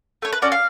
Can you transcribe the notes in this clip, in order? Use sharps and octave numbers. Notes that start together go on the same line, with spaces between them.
A3 C#5
B4
C#4 F#4 A4 D5
F5